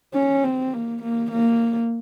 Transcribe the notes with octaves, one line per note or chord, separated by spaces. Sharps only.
C#4
C4
A#3
A#3
A#3